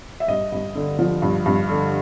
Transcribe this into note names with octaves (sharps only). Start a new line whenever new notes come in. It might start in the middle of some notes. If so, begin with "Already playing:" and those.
E5
G2 D#5
G2
D3
F3
G2
G2
D3